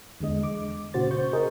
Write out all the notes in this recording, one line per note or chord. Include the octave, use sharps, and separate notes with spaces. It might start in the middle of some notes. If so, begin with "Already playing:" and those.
E2 D3 G#3 D#5
D6
A#2 C#3 F#4 C5 A6
C5 C#6 G6
G#4 A#4 D#5